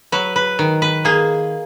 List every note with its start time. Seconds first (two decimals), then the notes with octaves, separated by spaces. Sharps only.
0.12 F#3 B4
0.36 B4
0.59 D#3
0.82 B4
1.05 A#3 G#4